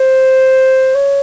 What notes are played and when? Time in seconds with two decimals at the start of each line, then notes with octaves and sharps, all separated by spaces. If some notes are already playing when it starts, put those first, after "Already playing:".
Already playing: C5
0.94 C#5